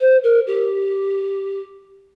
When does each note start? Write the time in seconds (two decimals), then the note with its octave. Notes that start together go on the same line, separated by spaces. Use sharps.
0.01 C5
0.23 A#4
0.47 G4